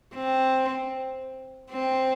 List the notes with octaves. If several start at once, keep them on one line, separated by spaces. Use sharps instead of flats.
C4
C4